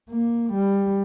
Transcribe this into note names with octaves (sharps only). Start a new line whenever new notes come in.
A#3
G3